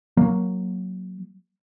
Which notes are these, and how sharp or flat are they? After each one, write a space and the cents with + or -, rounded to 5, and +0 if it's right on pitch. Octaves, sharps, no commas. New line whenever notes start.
F#3 +0 A#3 +0